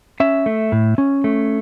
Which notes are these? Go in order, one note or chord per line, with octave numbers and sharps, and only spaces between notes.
C#4 E5
A3
A2
C#4
A3